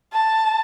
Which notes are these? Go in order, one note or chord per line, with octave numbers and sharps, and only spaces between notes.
A5